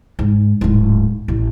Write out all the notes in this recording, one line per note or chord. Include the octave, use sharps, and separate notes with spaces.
G#2
D1 G#2
A1